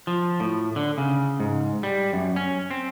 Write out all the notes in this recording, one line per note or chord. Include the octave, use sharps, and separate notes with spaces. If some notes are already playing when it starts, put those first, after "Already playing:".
F3
A2
D3
C#3
G#2
G3
F#2
C#4
C4